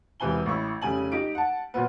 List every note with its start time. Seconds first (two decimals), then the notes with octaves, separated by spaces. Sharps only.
0.20 E1 C3 E3 G#5 G7
0.46 A1 E4 C#6 E6
0.82 F1 C#3 G3 G#5 F#7
1.12 D#4 G4 D7
1.35 F#5 A5
1.74 A#2 F#3 B3